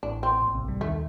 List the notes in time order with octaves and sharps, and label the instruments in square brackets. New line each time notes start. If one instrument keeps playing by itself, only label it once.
[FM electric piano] A1 A2 [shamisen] D4
[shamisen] C4
[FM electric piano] A#1 A#2
C2 C3
G2 G3
[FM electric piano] D#2 D#3 [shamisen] A3